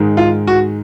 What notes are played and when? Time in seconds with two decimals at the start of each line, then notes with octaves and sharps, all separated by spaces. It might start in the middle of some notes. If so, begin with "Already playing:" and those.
Already playing: G#2 D#3 G#3 D#4
0.17 F4
0.47 F#4